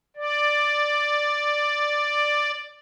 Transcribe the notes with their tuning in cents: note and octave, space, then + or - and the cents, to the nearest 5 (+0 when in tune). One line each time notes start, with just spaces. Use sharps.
D5 +5